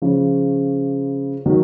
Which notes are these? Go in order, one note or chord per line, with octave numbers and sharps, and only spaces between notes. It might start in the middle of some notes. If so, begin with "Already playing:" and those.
C#3 F3
D#3 F#3